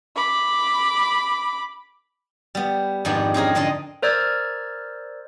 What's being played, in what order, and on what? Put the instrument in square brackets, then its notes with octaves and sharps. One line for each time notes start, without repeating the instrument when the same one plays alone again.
[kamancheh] B5 D6
[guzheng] G3 B3
F2 G#2 D#3 G3 B3 D4
C4 C#4 G#4 A#4
D3 C4 D4 D5 D#5
[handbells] A#4 C5 D5 E6 F6 G#6